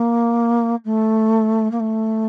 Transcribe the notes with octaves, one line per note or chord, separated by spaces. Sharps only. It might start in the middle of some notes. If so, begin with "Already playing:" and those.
Already playing: A#3
A3
A#3
A3